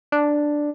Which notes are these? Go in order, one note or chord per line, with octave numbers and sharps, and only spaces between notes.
D4